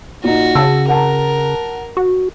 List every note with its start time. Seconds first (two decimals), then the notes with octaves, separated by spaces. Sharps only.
0.24 A#2 D#4 F#4
0.55 C#3 A5 E6
0.88 A#4 F#5 A5 A#5
1.97 F#4